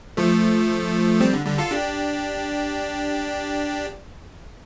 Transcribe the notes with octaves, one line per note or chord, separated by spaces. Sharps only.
F3 A3
G3 C4
D3
D3 G3
F4 A4
D4 G4